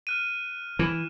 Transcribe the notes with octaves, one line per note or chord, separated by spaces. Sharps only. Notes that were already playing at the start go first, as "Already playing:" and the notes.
F6 F#6 D#7
E3 E7